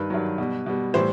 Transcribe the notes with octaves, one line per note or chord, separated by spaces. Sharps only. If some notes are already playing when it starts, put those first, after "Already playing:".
Already playing: G2 D#3 B4
G2 D#3 F#3
B2 G3
B2 G3
A2 E3 G3 C5